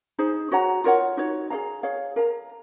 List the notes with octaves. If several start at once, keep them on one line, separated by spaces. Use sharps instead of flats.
D#4 G#4 C5
F#4 C#5 F#5 A#5
F4 A#4 C#5 F#5
D#4 F#4 C#5
G#4 C#5 F5 A#5
G#4 C#5 F5
A#4 F5 A#5